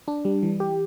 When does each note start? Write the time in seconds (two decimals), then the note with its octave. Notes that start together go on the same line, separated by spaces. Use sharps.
0.08 D4
0.25 G3
0.43 E3
0.60 G4